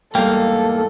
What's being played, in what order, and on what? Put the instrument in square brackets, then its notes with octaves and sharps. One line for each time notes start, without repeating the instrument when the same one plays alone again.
[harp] E2 G#2 G3 [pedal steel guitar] A#3 [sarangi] A4 [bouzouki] F5 G5